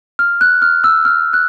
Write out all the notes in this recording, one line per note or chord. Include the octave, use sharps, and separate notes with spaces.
F6
F#6
F6
E6
F6
F#6